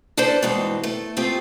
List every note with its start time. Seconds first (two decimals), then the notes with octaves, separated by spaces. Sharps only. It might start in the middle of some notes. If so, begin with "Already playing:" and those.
0.17 D4 E4 A4 B4 C5 D5
0.42 G2 B2 E3 G#3 C4 D#4
0.84 A3
1.17 A3 C4 F4 G4 G#4